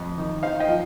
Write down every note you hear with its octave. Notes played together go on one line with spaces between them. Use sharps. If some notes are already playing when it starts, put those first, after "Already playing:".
Already playing: F2
D#3
D#4 C5 F5
D#5 G5
F3